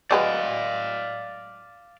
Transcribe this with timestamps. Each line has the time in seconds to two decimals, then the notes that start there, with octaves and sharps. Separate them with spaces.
0.11 F#3 G#3 B4 D5 F5